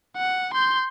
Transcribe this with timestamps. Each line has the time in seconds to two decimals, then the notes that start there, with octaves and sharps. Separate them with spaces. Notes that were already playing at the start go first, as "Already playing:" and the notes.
0.17 F#5
0.53 C6 G6